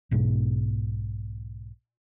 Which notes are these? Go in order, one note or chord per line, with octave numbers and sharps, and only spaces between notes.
B1 G#2 B2